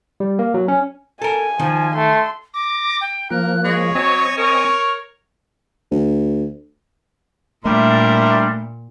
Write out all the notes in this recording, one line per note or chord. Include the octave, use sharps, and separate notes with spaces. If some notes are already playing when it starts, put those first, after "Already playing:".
G3
A#3
F#3
C#4
A4 A#4 G#5
D#3 F3
A3 C6
D6 A#6
G5
F3 A#3 A#4 F#6
G#3 C#5
F#3 C4 D#5 G#5 C#6
A#4 C#5
D2
A#2 G3 A3 D4 E4 A#4 C6